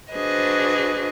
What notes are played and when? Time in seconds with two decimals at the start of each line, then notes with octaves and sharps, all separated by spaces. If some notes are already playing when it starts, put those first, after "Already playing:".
0.12 D4 F#4 G#4 B4 C5 D#5